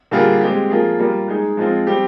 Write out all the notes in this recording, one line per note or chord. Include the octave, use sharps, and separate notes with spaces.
D3 G3 A#3 F4 G#4
G#3 C4 G4
F3 A#3 F4 G#4
G3 A#3 F4
G#3 D#4 G#4
F3 G#3 C4 F4
G3 C4 G4